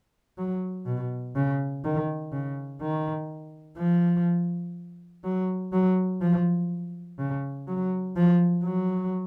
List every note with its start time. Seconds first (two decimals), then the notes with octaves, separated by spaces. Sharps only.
0.38 F#3
0.87 B2
1.35 C#3
1.84 D#3
2.32 C#3
2.81 D#3
3.78 F3
5.24 F#3
5.73 F#3
6.21 F3
7.19 C#3
7.68 F#3
8.16 F3
8.64 F#3